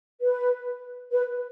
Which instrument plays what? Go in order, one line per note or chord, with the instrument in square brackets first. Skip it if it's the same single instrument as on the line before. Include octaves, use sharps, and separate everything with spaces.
[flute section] B4
B4